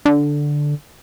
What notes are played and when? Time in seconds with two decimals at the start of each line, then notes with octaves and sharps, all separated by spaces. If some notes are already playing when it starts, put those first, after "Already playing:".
0.06 D3